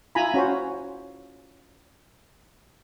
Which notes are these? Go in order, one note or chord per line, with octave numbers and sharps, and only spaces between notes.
E4 F4 G#5 A#5 B5
C#4 F#4 C5